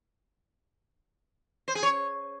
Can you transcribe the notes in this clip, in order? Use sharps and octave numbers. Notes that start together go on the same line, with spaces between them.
C5
G#4
C#5